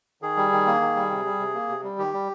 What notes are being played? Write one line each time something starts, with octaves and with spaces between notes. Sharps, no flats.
D#3 G#4
G3
D#3
A#3
D#3
G3
C3
G3
C3
A#3
C3
G3
D#3 G4
G3